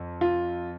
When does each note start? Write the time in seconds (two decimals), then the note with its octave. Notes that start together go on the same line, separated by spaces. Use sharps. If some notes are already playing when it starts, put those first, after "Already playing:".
Already playing: F2
0.21 F4